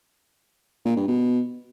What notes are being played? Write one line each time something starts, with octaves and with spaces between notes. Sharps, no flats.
A#2
G2
B2